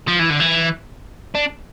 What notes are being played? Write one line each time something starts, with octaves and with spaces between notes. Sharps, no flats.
F3
E3
D3
E3
D4